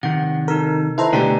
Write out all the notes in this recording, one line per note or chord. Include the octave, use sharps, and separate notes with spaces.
C3 D#3 F#5
D#4 A4 A#4
E4 A4 B4 C5 D#5 A#5
B2 D3 A3 G4 A4 D5 G#5